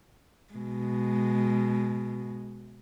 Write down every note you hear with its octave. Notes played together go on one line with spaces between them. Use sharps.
B2 G#3